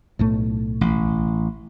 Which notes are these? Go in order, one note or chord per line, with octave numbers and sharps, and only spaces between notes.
B1 A2 A3
A1